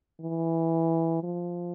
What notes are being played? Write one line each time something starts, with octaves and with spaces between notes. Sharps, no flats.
E3
F3